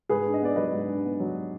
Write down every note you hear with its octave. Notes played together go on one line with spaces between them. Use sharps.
G#2 G#4 B4
D4
D#5
B3 D5
F#3 B4 D#5
G#2
D4
B3
F#3